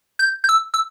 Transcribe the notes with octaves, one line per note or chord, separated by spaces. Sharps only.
G6
G6
E6
E6